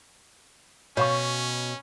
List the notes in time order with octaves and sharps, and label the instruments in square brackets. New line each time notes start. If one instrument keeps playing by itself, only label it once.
[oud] B2 [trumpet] C#4 [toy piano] C#5 F5 C#6